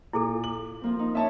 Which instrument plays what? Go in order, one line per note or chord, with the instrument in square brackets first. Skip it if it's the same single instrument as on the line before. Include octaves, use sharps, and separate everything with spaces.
[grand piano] A#2 [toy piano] E4 G#4 A4
[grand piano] F#7
[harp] F3 A#3 C4
D#4
[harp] C#4 C#5 [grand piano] E5 A5